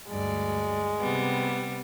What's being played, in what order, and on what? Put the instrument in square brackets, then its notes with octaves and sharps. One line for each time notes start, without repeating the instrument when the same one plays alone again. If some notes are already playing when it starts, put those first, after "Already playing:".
[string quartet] D2 G2 D5 [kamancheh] G#3
[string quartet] C3 G3 B3